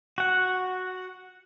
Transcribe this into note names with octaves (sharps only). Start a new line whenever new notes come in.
F#4 F#5